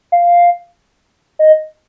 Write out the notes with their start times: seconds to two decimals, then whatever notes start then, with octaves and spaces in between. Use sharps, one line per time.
0.12 F5
1.39 D#5